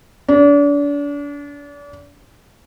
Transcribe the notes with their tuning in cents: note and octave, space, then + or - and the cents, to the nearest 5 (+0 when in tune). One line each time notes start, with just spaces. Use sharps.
D4 -35